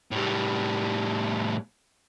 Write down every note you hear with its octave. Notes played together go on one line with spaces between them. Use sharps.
A2 G3